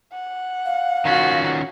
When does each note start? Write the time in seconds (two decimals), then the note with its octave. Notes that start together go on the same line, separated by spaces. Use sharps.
0.12 F#5
0.65 F5
1.05 D#3 C#4 F4 F#4